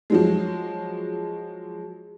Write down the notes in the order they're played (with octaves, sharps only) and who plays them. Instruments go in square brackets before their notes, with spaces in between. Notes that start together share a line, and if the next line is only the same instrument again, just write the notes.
[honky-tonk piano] F3 F#3 G#3